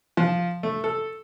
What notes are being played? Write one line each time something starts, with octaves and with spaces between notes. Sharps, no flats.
F3
A3
A4